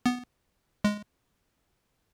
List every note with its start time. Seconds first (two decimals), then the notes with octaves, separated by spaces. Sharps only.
0.06 B3
0.84 G#3